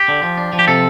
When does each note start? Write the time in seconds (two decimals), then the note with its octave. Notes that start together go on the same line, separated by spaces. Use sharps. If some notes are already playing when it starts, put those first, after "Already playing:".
Already playing: G4
0.08 D3
0.23 F3
0.38 D4
0.53 F3
0.59 G4
0.68 C3 A4